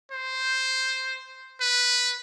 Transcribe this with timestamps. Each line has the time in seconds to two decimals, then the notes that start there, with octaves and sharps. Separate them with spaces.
0.12 C5
1.61 B4